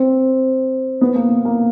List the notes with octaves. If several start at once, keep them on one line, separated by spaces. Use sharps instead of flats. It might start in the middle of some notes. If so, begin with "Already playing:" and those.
Already playing: C4
B3
A#3
A#3